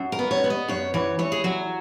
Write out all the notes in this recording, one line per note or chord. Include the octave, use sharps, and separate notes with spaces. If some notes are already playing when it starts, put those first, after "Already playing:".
Already playing: F#2
A#4
B3
C#5
B3
D#5
F#2 C#5
E3 C#5
E3 C#5
G#4
F#3 F#4